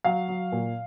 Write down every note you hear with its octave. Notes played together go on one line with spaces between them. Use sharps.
F#3 F5
F#3
A#2